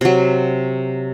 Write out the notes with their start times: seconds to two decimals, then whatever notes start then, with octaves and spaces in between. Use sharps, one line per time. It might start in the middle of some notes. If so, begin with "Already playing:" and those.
0.01 C3 F#3